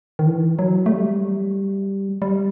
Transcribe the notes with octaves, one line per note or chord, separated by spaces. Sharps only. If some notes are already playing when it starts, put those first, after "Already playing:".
D#3
E3
F#3
A3
G3
G3